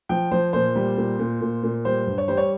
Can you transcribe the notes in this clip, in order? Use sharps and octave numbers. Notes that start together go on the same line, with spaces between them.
F3 G5
F3 C5
A#2 C5
G3
A#2
A#2
A#2
A#2
G3 C5
G2
C#5
G3 C5
C#5